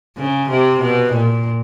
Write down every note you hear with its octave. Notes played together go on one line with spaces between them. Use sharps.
C#3
C3
B2
A#2